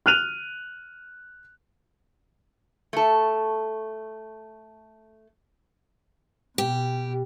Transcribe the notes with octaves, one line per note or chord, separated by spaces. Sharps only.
F6 F#6 D#7 F7
A3 A4
B2 G4